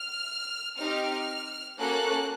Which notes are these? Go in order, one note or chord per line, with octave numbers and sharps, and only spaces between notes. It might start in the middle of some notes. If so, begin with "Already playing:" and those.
Already playing: F6
C4 D#4 G4 F6
A#3 C#4 F#4 A4 F#6